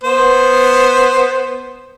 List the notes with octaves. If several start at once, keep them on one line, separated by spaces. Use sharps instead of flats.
B3 C5